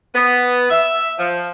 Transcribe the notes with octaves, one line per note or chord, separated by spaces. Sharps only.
B3
E5
F3